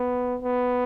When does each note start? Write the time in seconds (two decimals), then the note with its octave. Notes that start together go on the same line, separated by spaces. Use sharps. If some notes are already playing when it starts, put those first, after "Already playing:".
Already playing: B3
0.42 B3